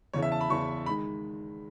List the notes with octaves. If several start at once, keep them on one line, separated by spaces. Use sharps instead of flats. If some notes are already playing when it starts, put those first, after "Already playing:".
E2 C#3 E3 C#5
E5
A5
B5
E2 C#3 E3 C#6
D#3 G#3 B5